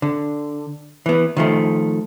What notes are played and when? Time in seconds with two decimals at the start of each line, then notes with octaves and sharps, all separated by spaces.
0.02 D3
1.06 E3 B3
1.37 D#3 F3 A3